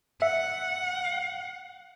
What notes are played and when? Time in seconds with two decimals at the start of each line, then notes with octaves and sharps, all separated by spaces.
0.22 E5 F#5